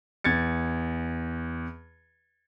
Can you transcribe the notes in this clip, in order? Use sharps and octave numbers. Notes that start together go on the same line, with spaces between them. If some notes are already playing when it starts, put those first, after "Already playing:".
E2 G#6 A6 C#7